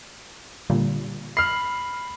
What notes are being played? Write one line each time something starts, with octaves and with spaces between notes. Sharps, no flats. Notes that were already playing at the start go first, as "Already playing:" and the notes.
A#2 D3 G3
B5 F6 C7